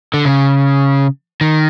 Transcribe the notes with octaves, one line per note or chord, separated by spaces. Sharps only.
D3
C#3
D#3